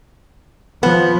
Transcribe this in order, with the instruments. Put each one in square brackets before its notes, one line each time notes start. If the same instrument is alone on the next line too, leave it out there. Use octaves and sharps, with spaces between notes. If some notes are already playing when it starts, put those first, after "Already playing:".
[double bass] F3 [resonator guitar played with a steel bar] B3